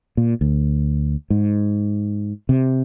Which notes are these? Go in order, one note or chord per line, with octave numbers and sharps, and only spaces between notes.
A#2
D2
G#2
C3